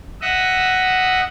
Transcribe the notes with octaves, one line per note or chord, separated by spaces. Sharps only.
D#5 E5 F#5